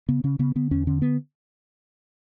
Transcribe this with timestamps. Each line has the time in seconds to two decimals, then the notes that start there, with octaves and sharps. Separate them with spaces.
0.09 C#3 B3
0.24 C#3 C#4
0.39 C#3 B3
0.55 D3 B3
0.71 E2 C#4
0.87 D3 C#4
1.02 B3